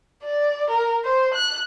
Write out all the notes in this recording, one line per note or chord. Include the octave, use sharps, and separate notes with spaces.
D5
A#4
C5
F#6